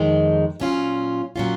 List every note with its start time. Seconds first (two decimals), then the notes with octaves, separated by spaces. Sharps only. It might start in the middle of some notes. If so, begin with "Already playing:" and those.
Already playing: F2 D#3 G#3 D#4
0.60 A#2 F#3 C#4 F4
1.36 A#2 F#3 C#4 F4